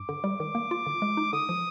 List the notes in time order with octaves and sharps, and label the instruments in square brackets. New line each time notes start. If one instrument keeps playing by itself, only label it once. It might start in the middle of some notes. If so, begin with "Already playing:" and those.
Already playing: [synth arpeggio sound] G2 [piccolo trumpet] D6
[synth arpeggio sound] D3
G3
[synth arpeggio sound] D#3 [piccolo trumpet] D6
[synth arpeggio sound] A#3
F4
D3
G#3
D#4
[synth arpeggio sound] D3 [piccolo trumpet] D#6
[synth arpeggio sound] F3